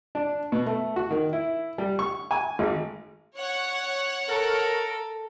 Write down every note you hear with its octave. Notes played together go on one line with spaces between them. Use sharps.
D4
B2
A3
F#4
D#3
E4
G3
C#6
G#5
G#1
C#5 F#5
A4 A#4